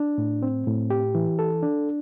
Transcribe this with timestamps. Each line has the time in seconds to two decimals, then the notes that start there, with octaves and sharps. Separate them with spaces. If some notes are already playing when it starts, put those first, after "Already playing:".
Already playing: D4
0.18 A2
0.43 C4
0.67 A2
0.90 G4
1.15 E3
1.39 A4
1.63 D4